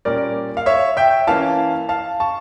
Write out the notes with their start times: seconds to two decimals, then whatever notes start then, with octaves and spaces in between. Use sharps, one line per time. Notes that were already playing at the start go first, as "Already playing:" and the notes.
0.05 A#2 G3 A#3 C#4 A#4 D5
0.57 F5
0.66 C#5 E5
0.97 E5 G5
1.27 E3 A#3 C#4 F5 A5
1.89 F5 A5
2.20 A5 C#6